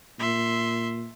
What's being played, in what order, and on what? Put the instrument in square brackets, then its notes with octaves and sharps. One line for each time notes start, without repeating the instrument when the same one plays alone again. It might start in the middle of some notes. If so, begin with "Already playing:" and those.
[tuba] A#2 [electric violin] E5 C6